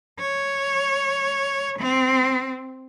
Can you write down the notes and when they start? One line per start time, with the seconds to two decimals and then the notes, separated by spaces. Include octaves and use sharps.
0.19 C#5
1.79 C4